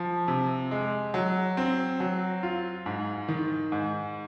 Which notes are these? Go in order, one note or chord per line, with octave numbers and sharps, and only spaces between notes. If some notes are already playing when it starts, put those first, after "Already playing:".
Already playing: F3
C3
G#3
F#3
C4
F#3
F4
G#2
D#3
G#2